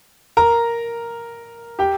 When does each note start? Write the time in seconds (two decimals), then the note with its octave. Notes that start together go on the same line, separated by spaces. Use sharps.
0.37 A#4 A#5
1.79 G4 G5